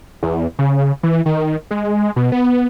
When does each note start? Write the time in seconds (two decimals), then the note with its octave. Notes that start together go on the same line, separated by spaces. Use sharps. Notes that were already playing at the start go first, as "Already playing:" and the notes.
0.23 E2
0.59 C#3
1.03 E3
1.26 D#3
1.71 G#3
2.16 B2
2.32 B3